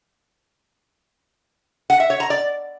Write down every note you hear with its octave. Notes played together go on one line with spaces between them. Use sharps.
F#5
E5
C#5
A#5
D5